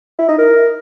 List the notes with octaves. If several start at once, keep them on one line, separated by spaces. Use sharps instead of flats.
E4
D#4
A#4